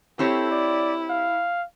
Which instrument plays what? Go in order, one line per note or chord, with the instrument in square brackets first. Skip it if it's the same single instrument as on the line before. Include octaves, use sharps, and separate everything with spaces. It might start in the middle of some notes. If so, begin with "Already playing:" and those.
[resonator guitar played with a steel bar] C4 G4 C#5 [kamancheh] E4 [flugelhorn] A4
[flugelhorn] D5
F5